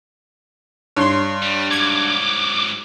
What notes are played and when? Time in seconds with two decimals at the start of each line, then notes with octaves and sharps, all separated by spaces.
0.96 G2 C#5 C6
1.43 G3
1.71 G#2 F#3 D6 G#6